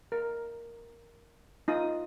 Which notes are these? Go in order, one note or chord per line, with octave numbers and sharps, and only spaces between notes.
A#4
D#4 F4 D#6